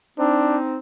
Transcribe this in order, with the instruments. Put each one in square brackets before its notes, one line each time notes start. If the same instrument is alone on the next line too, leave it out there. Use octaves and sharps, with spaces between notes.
[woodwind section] C4 D#4 [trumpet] D4